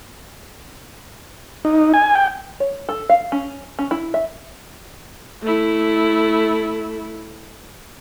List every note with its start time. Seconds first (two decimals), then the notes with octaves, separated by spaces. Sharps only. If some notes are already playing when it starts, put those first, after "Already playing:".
1.65 D#4
1.94 G#5
2.15 G5
2.60 C#5
2.89 A4
3.09 F5
3.32 C#4
3.79 C#4
3.91 E4
4.14 E5
5.42 A3 E4